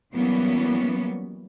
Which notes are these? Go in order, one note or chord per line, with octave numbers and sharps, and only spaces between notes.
E3 F#3 G3 A#3 B3 C#4